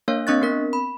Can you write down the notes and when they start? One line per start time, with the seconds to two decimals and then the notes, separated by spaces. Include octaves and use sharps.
0.08 A#3 D4 A#4 C#5 F5
0.27 C4 D4 D#5 C#6 F#6 A6
0.41 B3 C4 A#4 B6
0.73 B5